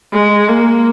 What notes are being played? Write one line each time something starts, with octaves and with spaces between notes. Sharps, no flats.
G#3
A#3